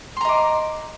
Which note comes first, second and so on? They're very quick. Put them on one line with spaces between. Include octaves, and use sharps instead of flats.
C6 A#5 D#5 D6